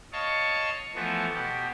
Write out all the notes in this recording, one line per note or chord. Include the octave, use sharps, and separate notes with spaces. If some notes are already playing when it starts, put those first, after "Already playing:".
C#5 D#5 F5 A5 C#6
E3 F3 A3 B3
B2 G4